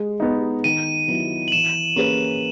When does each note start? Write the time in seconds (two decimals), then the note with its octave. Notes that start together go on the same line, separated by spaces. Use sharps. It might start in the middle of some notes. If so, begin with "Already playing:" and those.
Already playing: G#3
0.20 B3 D#4
0.64 D#3 D#7
1.08 F#3 B3 E4
1.48 F#7
1.52 E3 E7
1.96 A#3 C#4 G#4 B4